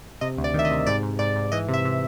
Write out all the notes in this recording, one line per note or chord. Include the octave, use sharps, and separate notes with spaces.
C3 D#5
D2
D5
D#3 E5
D#5
C3
G#2 D5
G#2
G#2 D5
G#2
E3 D#5
C3
E5
C3